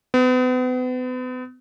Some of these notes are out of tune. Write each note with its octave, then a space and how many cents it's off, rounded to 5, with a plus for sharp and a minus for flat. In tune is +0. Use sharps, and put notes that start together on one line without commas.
B3 +40